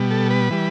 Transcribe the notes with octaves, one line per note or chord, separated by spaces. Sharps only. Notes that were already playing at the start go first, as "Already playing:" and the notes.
Already playing: B2 G3
A4
B4
E3 G3